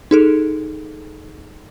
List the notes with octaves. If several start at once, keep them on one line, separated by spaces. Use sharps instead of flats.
D#4 G#4 A4